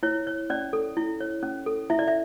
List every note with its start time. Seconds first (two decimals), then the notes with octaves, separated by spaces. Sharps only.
0.03 E4 C#5
0.27 C#5
0.50 C#4 D5
0.73 A4
0.97 E4
1.21 C#5
1.43 C#4
1.66 A4
1.90 E4 E5
1.99 D5
2.08 E5